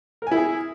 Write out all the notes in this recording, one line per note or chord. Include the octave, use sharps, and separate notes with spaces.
E4 G#4 A#4 G#5